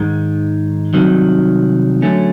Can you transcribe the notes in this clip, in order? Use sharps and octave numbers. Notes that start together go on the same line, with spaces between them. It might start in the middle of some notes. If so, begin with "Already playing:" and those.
Already playing: G#2 D#3 G#3
C2 C3 D#3 F#3
D3 F#3 A3 C#4